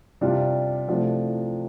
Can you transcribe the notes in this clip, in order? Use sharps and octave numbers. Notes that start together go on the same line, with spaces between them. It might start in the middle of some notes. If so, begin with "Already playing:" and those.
C3 G3 D4 F4
C3 F3 A3 D4